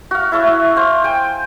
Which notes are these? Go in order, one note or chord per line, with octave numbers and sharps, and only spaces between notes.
F#4 F5
E4 A4 C#5 E5
C5 F5
G5 G#5